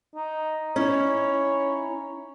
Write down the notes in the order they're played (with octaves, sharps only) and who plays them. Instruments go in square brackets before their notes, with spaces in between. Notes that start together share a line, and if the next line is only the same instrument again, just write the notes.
[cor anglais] D#4
[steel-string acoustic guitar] C#4 D#4 E4 [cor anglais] C#5